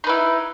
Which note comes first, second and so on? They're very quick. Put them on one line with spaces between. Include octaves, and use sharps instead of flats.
D#4 B4 E4